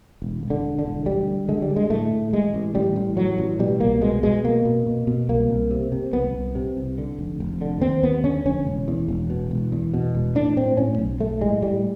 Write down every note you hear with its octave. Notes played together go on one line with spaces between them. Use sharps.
E1
E1
D3
E1
D3
E1
D2 G3
D3
D3 G#3
G3
D3
G#3
A2 A3
A2
A1 G#3
A1
A1 G3
A1
A2 F#3
A1
B2 G3
C2 A#3
B2 G#3
B2 G#3
B2 A#3
B2
B2
B2
C2 A#3
C2
C3
C3
C2 B3
C2
C3
C2
D3
F1
F1
D3
D#2 C4
D#2 B3
D3 C#4
F1 C#4
E1
E2
E1
B2
E1
E2
B2
E1
A2 D4
A2 C4
A2 C#4
B1
B1 A3
A2 G#3
A2 G3